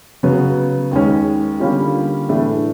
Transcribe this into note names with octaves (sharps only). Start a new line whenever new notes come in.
C#3 F#3 B3
D#2 D#3 G#3 C#4
D3 G3 A#3 C#4 F4
A2 E3 A3 D4